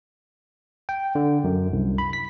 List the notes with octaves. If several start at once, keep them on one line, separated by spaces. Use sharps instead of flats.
G5
D3
F#2
C2
B5
B6